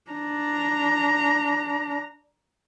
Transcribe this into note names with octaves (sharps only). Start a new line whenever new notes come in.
D4 A#5